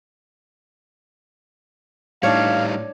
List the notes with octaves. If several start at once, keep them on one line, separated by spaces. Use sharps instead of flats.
A2 G3 D4 D#4 C#5 F5